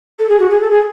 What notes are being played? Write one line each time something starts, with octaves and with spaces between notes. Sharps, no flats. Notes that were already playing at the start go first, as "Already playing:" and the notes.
A4
G#4
F#4
G#4
A4
G#4